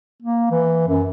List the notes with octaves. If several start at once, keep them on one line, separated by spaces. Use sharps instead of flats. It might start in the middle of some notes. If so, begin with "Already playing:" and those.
A#3
E3
F#2